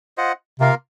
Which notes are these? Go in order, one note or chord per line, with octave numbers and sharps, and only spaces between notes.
F4 C5 D#5 F#5
C3 A#3 F4 A#4 F5